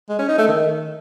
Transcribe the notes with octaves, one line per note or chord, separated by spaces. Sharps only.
G#3
C#4
D#4
A3
D#3